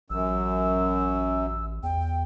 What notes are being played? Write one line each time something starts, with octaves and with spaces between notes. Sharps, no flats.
A1 F#2 E6
E2 G5